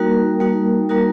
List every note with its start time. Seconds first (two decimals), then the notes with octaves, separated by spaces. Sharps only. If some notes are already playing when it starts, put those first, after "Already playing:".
Already playing: G3 A#3 D#4 F#4 A#4
0.40 G3 A#3 D#4 F#4
0.89 G3 A#3 D#4 F#4 A#4